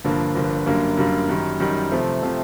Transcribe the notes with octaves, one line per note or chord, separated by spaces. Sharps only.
G1 G2 D3 F3 A#3
G1 G2 D3 F3 A#3
F#2 D3 G3 A#3
F#2 D3 G3 A#3
F#2 D#3 G3
F#2 D#3 G3
C3 F3 A3 C4
C3 F3 A3 C4